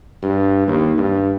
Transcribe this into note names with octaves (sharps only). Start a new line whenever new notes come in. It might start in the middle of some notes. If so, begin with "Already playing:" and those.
G2
D#2
G2